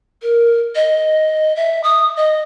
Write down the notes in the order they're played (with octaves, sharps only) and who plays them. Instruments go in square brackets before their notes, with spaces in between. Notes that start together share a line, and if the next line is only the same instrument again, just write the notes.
[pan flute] A#4
D#5
E5
D#6
D#5